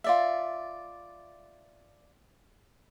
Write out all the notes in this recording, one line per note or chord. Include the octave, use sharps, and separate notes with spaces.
F4 D5 E5